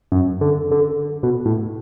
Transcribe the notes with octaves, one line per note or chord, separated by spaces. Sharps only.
F#2
D3
D3
B2
A2